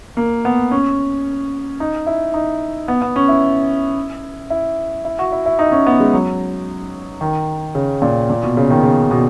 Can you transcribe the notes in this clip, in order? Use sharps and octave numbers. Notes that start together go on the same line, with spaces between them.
A#3
B3
C#4
D#4
E4
D#4
B3
B3
C#4
E4
E4
E4
F#4
E4
E4
D#4
C#4
B3
G#3
F#3
D#3
C#3
A#2
A#2
B2
C#3
D#3
C#3
B2